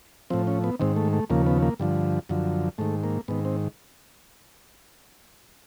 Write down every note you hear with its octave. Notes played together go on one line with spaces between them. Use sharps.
A2 F3 C4
C#4
B3
G#2 D#3 C4
A3
A3
D#2 C#3 F3 A#3
B3
A#3
G2 D3 F3
F#2 D3 F3
G#2 D#3 A3
A#3
G#2 D#3 B3
C4